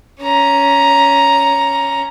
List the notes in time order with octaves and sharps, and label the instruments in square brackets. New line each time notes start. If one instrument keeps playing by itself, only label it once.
[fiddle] C#4 A#5